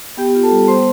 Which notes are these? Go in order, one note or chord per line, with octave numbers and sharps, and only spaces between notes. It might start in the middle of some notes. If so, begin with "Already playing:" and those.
B3 G4 G5
F4
A4 A5
G3
B3 C5 C6